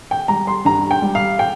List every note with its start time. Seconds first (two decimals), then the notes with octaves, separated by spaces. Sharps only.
0.11 G5
0.28 G3 A#5
0.47 C6
0.65 G2 A#5
0.91 G5
1.02 G3
1.15 F5
1.39 G5